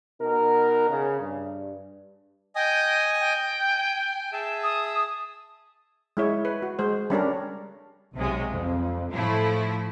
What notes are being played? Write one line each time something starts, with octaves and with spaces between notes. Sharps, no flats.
B2 D#4 A#4
C#3
G2
D#5 G5 G#5 D#6
G5
G#5
G#4 E5 A5
D#6
G#3 E4 C#5
B4
F#4
G#3 C5
G3 C#4 D4 A#4
B1 C3 F#3 G#3
F2
A2 F3 A3 E4